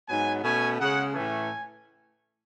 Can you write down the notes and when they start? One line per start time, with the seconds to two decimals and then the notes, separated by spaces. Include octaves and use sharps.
0.09 G#2 F#3 B3 G#5
0.44 B2 A3 C#4 G#5
0.79 C#3 G#3 C#4 F#5
1.14 A2 E3 A3 C#4 G#5